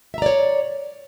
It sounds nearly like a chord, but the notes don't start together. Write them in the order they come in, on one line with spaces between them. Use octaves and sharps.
E5 A#5 D5 C#5